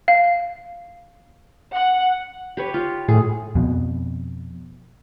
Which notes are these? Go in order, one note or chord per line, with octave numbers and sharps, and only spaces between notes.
F5
F#5
G4 B4 C#5
F4
A2 G#4
F2 B2